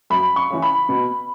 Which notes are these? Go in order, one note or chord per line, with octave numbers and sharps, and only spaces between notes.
F#2 B5
C#6
C#3 E3
B5
B2